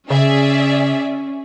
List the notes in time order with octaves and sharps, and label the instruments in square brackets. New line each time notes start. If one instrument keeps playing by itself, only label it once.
[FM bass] C#3 [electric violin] C#4 [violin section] G#4 D5 E5